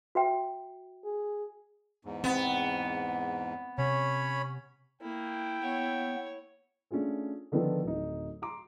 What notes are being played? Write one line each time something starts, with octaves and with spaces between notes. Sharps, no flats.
F#4 E5 G5
G#4
E2 G#2
B3 C4
C3 C#4 C#5 B5
A#3 E4 G5
B3 C#5
A3 C#4 D4 F4 G#4
D3 D#3 F3 B3 F4 A4
D1 D#4
A#5 C6 D6